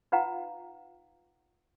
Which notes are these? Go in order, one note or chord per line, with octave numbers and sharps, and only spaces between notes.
D#4 F4 B4 F5 F#5 A#5